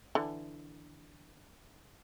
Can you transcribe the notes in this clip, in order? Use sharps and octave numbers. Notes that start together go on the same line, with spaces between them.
D3 E3